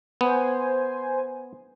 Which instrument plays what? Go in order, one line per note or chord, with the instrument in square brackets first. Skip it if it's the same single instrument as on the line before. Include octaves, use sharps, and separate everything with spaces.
[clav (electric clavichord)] B3 [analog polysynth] C5 G#5